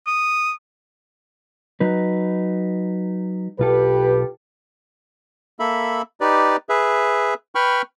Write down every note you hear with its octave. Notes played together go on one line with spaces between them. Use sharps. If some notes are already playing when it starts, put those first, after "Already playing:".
D#6
F#3 D#4 B4
B1 F4 G4 A4 B4
A#3 A4 E5 B5
D#4 G4 B4 D5
G#4 B4 E5
B4 G5 B5 C#6 F6